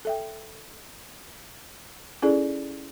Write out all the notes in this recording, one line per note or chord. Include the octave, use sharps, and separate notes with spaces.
A4 E5 G5
C#4 D#4 E4 G#4 A4 D5